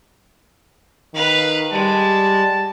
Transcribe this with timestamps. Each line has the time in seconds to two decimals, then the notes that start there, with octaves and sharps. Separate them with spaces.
1.14 D#3 B4 F5
1.73 G3 G#3 A5